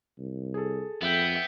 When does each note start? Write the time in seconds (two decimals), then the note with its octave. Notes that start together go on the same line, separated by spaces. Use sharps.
0.18 C2
0.54 G#4 A4
1.02 F2 B3 E5 G5